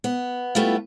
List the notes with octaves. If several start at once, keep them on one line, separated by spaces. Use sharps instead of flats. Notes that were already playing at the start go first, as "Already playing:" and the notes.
B3
G3 A3 B3 E4 F4